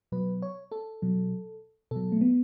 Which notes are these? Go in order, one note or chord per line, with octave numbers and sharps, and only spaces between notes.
B2 F#3 B4
C#5
A4
B2 F#3
B2 F#3 A4
A3
B3